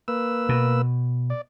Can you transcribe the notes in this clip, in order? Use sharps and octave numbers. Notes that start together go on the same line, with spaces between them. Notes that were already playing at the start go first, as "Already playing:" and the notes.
A#3 B4 E6
B2
D5